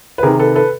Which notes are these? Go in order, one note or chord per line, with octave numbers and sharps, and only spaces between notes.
B4
C3 D#3 G#4 A#4
A4 B4
A4 B4